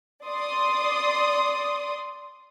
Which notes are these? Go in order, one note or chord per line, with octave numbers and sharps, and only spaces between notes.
D5 C6 D#6